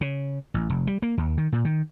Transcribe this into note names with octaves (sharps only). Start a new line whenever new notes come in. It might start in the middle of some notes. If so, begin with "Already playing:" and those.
C#3
A1
F1
G3
A#3
D#2
D#3
A#2
D#3